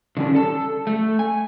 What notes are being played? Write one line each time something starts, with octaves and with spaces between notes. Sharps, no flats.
D3 D#3 G3 C#4 D4
A4 A5
A3
G#5